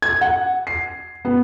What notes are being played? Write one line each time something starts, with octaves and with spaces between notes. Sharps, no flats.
G#6
F#5
C7
B3